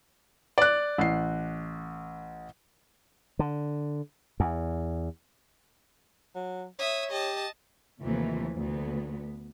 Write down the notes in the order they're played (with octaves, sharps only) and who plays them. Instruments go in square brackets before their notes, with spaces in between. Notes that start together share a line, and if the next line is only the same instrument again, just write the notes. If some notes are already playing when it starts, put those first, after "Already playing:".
[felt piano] D5 F#6
A1 C7
[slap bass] D3
E2
[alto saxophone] F#3
[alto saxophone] C#5 [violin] E5 D#6
[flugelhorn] G4 [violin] D#5 A5
[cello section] D#2 C3 E3 F3 A3
D2 B3